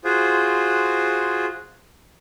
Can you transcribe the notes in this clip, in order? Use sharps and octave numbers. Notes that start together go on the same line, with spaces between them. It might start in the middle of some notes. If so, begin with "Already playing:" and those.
F4 F#4 G#4 C5